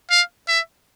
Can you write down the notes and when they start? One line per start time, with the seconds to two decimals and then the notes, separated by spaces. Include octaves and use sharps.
0.10 F5
0.48 E5